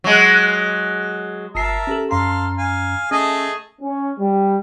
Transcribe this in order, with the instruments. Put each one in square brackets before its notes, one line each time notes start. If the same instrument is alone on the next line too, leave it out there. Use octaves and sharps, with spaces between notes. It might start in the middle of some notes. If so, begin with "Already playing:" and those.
[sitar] F#3 G#3
[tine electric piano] G1 C7 [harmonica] A#4 E5 A5
[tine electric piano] C#4 G4 A4
[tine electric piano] F#2 C#4 A#5 [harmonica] A4 F5 C6
[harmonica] F5 G#5
[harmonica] A3 G#4 D#5 [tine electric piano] C#4
[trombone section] C#4
G3